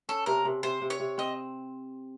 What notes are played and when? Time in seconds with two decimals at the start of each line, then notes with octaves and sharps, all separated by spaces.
0.09 C#4 A4
0.26 C3 A#4
0.45 C3
0.63 C3 C5
0.82 C3
0.90 C#5
1.00 C3
1.18 C4 D#5